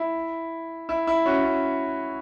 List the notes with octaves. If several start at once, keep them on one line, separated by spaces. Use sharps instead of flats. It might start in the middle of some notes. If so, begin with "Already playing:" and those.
Already playing: E4
E4
E4
C#4 F#4
C#4